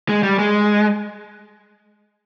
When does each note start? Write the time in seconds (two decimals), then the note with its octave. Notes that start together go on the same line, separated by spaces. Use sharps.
0.09 G#3
0.23 G3
0.39 G#3